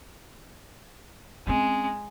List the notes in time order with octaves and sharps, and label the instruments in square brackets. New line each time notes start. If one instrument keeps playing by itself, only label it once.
[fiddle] G#3 [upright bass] C4 C#4